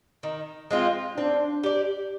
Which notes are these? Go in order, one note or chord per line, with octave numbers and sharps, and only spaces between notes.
D#3
G#3 C4 F4
C4 D4
G4 D5